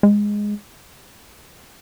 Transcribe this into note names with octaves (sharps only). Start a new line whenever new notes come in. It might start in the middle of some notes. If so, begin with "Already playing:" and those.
G#3